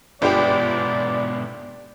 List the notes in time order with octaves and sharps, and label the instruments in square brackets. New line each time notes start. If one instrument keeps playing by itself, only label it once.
[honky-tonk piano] G1 [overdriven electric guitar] G#2 B2 [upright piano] D4 G4 [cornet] D5